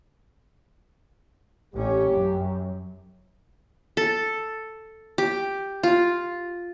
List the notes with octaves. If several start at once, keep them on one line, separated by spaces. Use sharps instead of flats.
A1 C#4 G4
F#2
A4
G4
F4